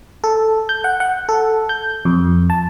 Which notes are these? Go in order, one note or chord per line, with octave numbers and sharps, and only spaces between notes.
A4
G6
F#5
F#5
A4
G6
F2
A5